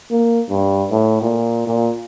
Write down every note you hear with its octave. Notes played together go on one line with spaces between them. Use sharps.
A#3
G2
A2
A#2
A#2